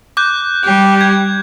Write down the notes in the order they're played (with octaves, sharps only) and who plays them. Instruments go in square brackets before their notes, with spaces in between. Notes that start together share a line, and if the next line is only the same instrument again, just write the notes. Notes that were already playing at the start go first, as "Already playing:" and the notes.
[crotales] D6 F#6 G6
[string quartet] G3 G4
[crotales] G#6